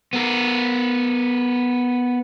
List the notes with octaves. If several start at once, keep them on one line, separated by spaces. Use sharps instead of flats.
B3 A#4